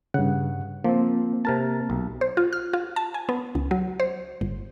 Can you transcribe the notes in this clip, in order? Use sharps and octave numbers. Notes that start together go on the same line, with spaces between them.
G2 C#3 F#5
F3 A#3 C4
C3 A#4 A5
B1
C5
F4
F6
F4
A5
G#5
B3
C#2
F#3
C5
G1